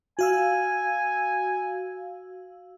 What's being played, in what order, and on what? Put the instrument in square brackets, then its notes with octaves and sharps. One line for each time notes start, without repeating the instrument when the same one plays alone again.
[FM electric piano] F#4 F5 E6 [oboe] G#5